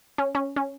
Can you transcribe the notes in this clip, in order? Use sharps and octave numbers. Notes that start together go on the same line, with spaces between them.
C#4
C#4
C#4